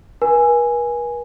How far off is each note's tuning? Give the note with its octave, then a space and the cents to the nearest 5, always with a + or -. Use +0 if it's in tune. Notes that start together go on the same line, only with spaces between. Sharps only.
B4 -45 G#5 +0